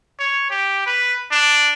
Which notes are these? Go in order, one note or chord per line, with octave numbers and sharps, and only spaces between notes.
C#5
G4
B4
D4